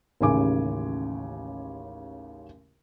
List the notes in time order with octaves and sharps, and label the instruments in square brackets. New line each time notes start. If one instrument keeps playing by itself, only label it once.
[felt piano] A1 D#2 C#3 G#5 D6